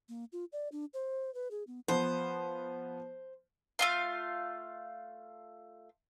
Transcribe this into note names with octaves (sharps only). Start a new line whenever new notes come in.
A#3
F4
D5
D4
C5
B4
G#4
B3
F3 B3 C5
A3 F4 F5